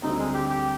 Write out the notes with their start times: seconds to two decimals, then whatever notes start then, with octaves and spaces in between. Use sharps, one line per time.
0.02 D2 D3 G3 C4 D#4
0.18 G#3
0.34 G4
0.50 G4